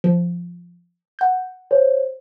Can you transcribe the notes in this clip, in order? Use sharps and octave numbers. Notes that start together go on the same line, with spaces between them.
F3
F#5 G6
C5 C#5